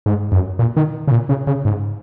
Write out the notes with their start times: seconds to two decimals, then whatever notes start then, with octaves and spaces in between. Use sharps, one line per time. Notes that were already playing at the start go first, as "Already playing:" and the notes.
0.06 G#2
0.32 F#2
0.59 A#2
0.77 D#3
1.08 C#3
1.11 A#2
1.29 C#3
1.47 C#3
1.65 G#2